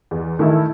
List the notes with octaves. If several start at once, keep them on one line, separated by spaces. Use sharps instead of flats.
E2
D#3 A3 E4 A4